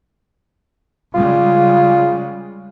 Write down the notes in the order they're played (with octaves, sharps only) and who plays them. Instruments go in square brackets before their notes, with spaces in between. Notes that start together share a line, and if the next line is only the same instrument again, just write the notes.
[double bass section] C#3 G3 G#3 [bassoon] F4